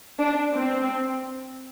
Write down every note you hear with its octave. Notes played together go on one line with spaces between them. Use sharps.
D4
C4